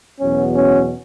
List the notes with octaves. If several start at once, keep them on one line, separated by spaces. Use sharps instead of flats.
E2 B2 F#3 B3 C#4
C#4